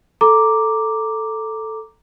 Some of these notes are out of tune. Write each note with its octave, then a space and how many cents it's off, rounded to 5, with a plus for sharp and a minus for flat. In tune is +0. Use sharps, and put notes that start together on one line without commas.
A4 +0 A#5 +0 D6 +0